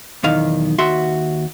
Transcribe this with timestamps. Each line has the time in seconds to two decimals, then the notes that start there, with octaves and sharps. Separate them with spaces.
0.24 B1 E2 D#3 F5
0.78 D#2 F#4 E5 C6